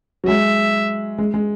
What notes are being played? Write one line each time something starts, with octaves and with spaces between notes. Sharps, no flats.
F#3
G#3 E5
G#3
G#3